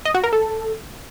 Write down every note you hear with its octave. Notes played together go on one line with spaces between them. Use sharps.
D#5
F#4
A#4
A4